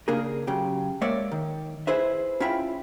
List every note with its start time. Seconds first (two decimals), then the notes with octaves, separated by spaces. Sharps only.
0.08 C#3 A#3 D4 G#4 A#4
0.47 F#2 C#3 G4
1.01 G#3 A#3 C#5 D5 E5
1.31 D#3
1.87 E4 G#4 B4 C5 E5
2.40 C#4 E4 F4 E5 G5 B5